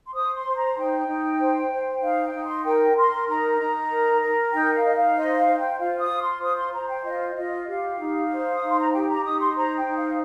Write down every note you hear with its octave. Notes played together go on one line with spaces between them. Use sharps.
C6
C5 D#6
C6
C5
A#5
D#4 G5
D#4
C5
C5
D#4 F5
G5
D#4
C6
A#4 G5
A#4 C6
D#4 A#5
D#4
A#4
A#4
D#4 G5
F5
D#4 D#5
F5
C5 D#5
F5
C5
G5
F4 F5
D#6
F4
C6
C5 D#6
C6
C5 A#5
G5
F4 D#5
F4 D#5
G4 F5
D#4
C5
D#6
D#4
C6
A#5
G4 G5
A#5
D#4 D#6
C6
C5 A#5
G5
D#4
F5